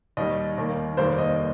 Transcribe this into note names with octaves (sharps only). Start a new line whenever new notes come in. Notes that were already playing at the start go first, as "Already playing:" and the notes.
D#2 D#3 G3 D#5
D#2 D#3 A#3
F1 D#2 D#3 G3 A#3 C5
D#5